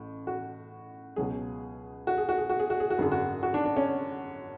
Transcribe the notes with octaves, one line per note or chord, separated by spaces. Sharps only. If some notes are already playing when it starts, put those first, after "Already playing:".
Already playing: A1 A2
F#4
C#2 B2 F#3 G#4
F#4
G#4
F#4
G#4
F#4
G#4
F#4
G#4
F#4
G#1 F#2 D3 G#4
F#4
F#4
D4
D4
C#4